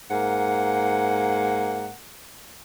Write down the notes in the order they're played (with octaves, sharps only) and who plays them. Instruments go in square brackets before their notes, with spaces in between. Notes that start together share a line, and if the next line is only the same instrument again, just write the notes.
[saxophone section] G#2 A#3 F#5